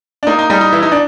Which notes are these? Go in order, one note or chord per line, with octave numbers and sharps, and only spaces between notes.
D4
A#3 D#4
D#4
G3 D#4
D#4
E3 E4
D#4
D4